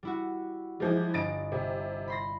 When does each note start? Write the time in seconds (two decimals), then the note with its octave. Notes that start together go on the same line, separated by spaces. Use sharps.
0.03 G3 E4 F#4
0.80 E3 F3 G3 G#3
1.14 G1 D#5 A6 D7
1.52 C3
2.08 B5 C6 A#6